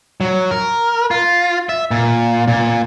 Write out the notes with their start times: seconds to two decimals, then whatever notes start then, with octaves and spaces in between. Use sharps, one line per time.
0.21 F#3
0.51 A#4
1.11 F4
1.69 E5
1.91 A#2
2.48 A#2